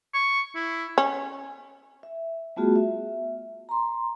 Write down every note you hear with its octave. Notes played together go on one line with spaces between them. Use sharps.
C#6
E4
C#4
E5
G3 A3 B3 F4 F#4 G#4
E5
A#5 C6